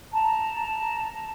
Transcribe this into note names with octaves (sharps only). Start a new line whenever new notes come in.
A5 A#5